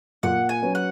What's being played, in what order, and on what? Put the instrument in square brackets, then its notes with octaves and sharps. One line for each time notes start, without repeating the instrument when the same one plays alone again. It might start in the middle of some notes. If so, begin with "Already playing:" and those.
[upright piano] A#2 [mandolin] F#5
[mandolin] G#5
[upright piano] F#3 C#4 F#4 B4
[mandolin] F#5